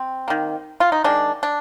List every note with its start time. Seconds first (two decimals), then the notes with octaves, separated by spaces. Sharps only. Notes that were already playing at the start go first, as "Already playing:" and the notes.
Already playing: C4
0.28 D#3 A#3
0.80 F4
0.92 D#4
1.04 D#3 G#3 D4
1.43 D4